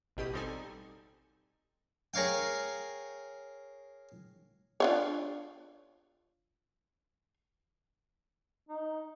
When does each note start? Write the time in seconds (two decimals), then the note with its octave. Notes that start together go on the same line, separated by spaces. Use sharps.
0.17 A1 B2 G4 B5 D#6
0.33 G3 C4 D#4 A4 G#5
2.14 G#4 A#4 C#5 F5 G5
4.80 D4 F4 C#5
8.69 D#4